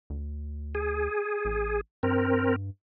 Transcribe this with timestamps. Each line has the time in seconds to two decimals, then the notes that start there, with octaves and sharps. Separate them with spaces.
0.10 D2
0.75 G#4
1.45 A1
2.03 G2 C4 A#4